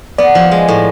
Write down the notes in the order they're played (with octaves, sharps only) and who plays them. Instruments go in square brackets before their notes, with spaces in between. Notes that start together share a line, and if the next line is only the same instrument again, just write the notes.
[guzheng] B3 [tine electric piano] D5
[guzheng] F3
G#3
A2